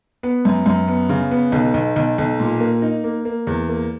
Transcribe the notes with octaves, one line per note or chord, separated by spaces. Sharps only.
B3
F#2
F#2
B3
C#3
B3
B1
B1
B1
B1
A#2
A#3
D#4
A#3
A#3
E2
A#3